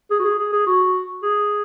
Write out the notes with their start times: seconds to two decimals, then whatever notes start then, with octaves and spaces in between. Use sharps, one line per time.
0.10 G#4
0.19 F#4
0.24 G#4
0.39 G#4
0.53 G#4
0.67 F#4
1.23 G#4